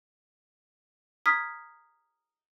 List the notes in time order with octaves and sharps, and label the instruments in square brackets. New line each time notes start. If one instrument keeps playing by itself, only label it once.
[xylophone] A#5 D#6 F6 G#6 B6